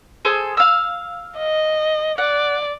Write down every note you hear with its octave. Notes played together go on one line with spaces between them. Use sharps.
G#4 A4 C5
F5 E6
D#5
D5 F#5